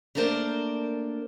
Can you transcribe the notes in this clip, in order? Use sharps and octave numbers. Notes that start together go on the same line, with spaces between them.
A3 A#3 D4 A#4 C5 D5